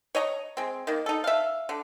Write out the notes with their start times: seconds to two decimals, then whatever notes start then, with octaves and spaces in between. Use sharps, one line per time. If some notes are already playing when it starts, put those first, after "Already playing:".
0.15 C#5 D#5 A#5
0.57 G#3 C4
0.87 D#3 A#3
1.06 D#4 A4
1.24 E5 F5
1.69 D3